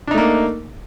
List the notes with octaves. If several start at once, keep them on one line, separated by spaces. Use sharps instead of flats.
A3 A#3 D4 D#4